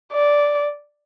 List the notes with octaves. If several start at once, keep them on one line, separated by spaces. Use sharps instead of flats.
D5